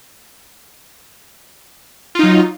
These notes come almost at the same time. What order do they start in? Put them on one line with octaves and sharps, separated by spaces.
F4 D#4 F#3